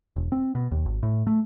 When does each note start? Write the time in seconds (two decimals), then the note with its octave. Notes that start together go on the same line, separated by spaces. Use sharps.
0.16 E1
0.32 C4
0.55 B2
0.71 D#2
0.86 G#1
1.03 A2
1.27 A3